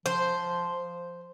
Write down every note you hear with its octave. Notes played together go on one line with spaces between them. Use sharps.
F3 C5